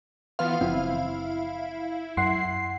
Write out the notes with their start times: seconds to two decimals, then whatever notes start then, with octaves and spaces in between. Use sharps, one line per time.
0.39 E3 B3 F4 F5
0.61 F#1 F3 C4 E4
2.17 F#2 F#5 C6 C7